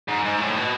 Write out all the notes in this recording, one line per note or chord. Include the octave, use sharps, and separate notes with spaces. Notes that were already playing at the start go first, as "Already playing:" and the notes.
G#2
G#2
A2
B2